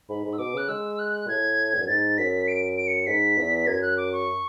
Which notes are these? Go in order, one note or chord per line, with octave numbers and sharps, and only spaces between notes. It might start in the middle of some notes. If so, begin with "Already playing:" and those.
G#2 B5
G#2
E6
B2 D6
C#3 F#6
G#3 E6
F#6
A2 G#6
E2
F#2
G#2 A6
F#2 B6
D7
D7
C#7
G#2 B6
E2
F#2 G#6
F#6
D6
C#6